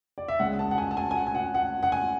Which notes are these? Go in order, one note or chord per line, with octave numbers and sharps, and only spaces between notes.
D5
E5
C#2 C#3 G#3 F#5
A5
F#5
G#5
A5
G#5
G#5
F#5
G#5
F#5
F#5
F#5
G#5